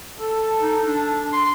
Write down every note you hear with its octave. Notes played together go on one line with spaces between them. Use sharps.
A4
D#4
D4
C6